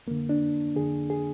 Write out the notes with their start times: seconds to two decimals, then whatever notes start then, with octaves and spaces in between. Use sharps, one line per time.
0.07 F2 D3 A#3
0.29 D4
0.76 F2 D3 G#4
1.10 G#4